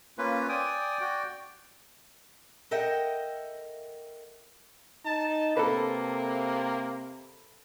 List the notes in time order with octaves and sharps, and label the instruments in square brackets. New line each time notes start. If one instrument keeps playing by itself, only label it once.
[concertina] A#3 B4 [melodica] C#4 F4
[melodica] D5 [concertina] G5 G#5 D#6
[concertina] F#4 G5
[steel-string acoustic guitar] A4 A#4 D#5 E5 F#5 G5
[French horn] D#4 [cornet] A5
[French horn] C3 [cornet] A#3 [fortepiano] A4 B4